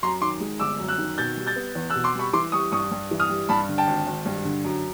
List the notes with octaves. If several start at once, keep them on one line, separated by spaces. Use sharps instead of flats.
F#2 A#5 C6
D#3 C6 D6
G#3
G1 D6 E6
F#2
E6 F#6
D#3
B2 G6 A6
G3
G6 A6
B3
E2
E6 F#6
B2
C6 D6
G3 B5 C#6
E3 C6 D6
G3 C#6 D#6
G2 C#6 D#6
G2
E3
D#6 F6
G3
G2 A5 B5
D3
G5 A5
G#1
G#1
G2
D3
F#2